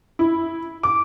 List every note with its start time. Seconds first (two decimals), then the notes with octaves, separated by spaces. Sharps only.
0.19 E4
0.83 D6